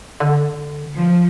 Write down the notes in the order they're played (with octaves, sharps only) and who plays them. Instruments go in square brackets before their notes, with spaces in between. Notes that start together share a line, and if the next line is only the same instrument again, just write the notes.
[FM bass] D3
[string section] F3